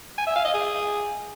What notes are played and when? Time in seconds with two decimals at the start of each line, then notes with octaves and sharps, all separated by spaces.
0.18 G#5
0.27 E5
0.36 F5
0.45 D#5
0.54 G#4